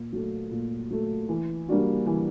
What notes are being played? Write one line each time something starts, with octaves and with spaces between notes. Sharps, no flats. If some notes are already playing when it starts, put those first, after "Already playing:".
Already playing: A#2
F#3 A3
A#2
F#3 A3
E3
G3 A#3 D4 F#4
E3